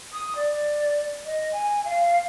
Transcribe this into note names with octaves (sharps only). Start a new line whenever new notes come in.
D#6
D5
D#5
G#5
F5